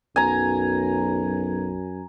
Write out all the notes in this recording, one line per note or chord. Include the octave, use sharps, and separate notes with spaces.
B1 F#2 G#5 A#5